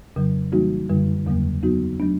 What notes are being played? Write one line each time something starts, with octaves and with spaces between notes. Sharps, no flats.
F2 C#3 F#3
E3 G3 A#3 D#4 F#4
F#2 D3 G3
E2 C#3 F#3 A#3
F#3 B3 D#4 F#4
F#3 A3 D4